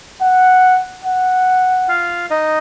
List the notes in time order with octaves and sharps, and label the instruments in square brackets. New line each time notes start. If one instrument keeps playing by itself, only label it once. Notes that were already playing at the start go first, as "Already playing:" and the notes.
[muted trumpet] F#5
F#5
[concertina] F4 F5
D#4 D#5